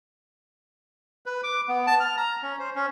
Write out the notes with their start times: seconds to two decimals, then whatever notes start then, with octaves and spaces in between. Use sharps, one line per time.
1.26 B4
1.43 D6
1.68 B3
1.87 A5
2.00 F6
2.17 A#5
2.42 C#4
2.59 C5
2.76 C#4